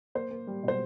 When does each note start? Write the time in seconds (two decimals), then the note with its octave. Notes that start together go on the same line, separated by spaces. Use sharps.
0.15 A#3 C5
0.31 A#3
0.47 G3
0.63 B2 C5